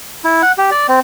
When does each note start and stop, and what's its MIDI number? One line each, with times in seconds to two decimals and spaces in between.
0.24 0.42 64
0.42 0.52 78
0.58 0.70 67
0.71 0.87 74
0.88 1.00 60